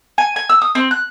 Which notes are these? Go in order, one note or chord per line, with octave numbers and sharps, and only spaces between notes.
G#5
G#5
E6
D#6
C4
F#6